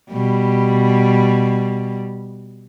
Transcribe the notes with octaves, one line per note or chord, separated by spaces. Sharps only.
B2 G3